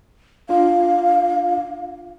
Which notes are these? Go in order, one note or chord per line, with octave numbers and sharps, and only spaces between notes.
D4 F4 F5